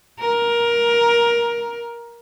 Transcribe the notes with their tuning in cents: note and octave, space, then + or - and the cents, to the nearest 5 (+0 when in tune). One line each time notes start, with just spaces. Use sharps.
A#4 +15